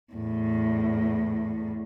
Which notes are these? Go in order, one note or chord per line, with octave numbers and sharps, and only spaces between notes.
E2 A2